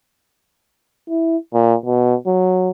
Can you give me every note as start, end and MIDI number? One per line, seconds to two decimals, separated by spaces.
1.09 1.37 64
1.54 1.75 46
1.86 2.15 47
2.27 2.71 54